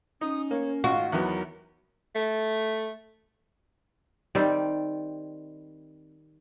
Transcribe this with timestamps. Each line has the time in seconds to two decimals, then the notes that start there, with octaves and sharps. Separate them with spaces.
0.21 C#4 D#4 D#6
0.51 A#3 C#5
0.84 G#1 F4 F#4
1.12 E2 D#3 F#3 B3 A#4
2.15 A3
4.35 D#3 G3 C4 D5